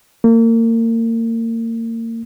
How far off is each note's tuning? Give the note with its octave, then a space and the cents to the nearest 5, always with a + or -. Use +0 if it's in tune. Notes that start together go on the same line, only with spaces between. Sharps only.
A#3 -35